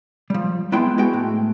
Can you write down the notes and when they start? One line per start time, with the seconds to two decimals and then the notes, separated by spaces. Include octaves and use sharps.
0.30 F3 G3
0.72 G#3 B3 E4 G5 C6
0.98 G#3 B3 F#4 G5
1.13 A2